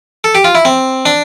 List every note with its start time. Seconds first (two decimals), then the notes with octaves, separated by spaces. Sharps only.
0.24 A4
0.35 G4
0.44 F4
0.55 E4
0.65 C4
1.06 D4